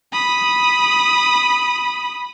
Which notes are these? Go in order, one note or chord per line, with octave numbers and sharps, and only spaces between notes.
B5 D#6